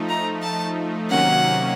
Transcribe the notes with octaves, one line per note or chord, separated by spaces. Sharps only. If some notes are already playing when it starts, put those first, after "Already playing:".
Already playing: F3 A3 D#4
A#5
A5
C3 D#3 F#3 A#3 C#4 F#5